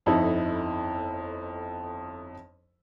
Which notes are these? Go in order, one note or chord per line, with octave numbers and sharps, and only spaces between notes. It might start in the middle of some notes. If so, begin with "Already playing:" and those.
G1 F2 D#4 E4 A4